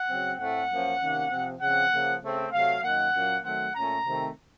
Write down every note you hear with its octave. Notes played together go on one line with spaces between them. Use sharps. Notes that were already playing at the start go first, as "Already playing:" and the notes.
Already playing: F#5
C#3 F#3 C4
A2 A3 C4 F#5
F#2 F3 A#3 C#4
C3 D#3 A#3 C#4
C3 F3 C4
C#3 F3 C4 F#5
C#3 F3 A#3
C#3 A3 C4
C3 F#3 A3 F5
F#2 D#3 A#3 F#5
A#2 F#3 A#3 C#4
D#3 F#3 A3 C4 F#5
A#2 A3 C#4 A#5
C3 D#3 A3 C4